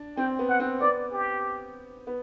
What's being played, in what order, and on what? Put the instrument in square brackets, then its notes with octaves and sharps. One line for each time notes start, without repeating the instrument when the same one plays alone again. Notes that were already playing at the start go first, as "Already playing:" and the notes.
Already playing: [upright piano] D4
[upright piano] C4 [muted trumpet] G5
[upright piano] B3
[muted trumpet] F#5
[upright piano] C4
[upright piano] B3 [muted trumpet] D5
[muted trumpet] G4
[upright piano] B3